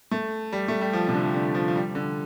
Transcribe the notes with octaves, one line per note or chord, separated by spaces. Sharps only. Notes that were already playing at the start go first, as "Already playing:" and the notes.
A3
G3
A3
G3
F3
C3
D3
D3
F3
F3
G3
D3